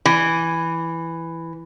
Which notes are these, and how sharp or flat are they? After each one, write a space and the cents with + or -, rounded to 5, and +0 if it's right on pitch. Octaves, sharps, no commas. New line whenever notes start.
E3 +5